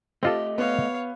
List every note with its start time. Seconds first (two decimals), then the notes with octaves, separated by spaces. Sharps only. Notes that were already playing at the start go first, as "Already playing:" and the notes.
0.23 A3 C4 F4 G4 A4 D#5
0.58 B3 C#5 F5